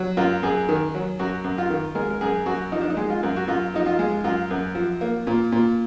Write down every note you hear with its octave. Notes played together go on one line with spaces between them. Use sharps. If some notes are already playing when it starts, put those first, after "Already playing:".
Already playing: F#3
F#2 F4
F#2 G#4
D#3
F#3
F#2 F#4
F#2
F4
D#3
G#3 A#4
A#4
F#2 G#4
F#2 F#4
F3 D#4
D4
D#4
G#3
F4
F#2
F#4
F#2 F4
F3 D#4
F4
G#3
F#2 F4
F#2
F3
A#3
A#2
A#2